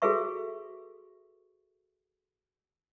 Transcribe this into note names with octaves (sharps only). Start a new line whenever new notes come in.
F#4 G#4 A4 B4 E5 C#6